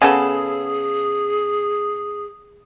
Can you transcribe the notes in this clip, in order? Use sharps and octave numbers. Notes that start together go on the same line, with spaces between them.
C#3 B3 G#4 A4